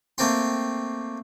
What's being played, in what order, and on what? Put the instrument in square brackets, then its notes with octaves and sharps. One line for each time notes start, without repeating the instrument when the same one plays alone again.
[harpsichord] A3 A#3 C4 G5 C6